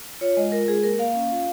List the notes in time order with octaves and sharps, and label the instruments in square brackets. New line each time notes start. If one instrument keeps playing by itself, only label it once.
[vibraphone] F4 C#5
G#3 D#5
F4 A#4
G#3 G#4
A#3 A#4
A#3 F5
C#4
F4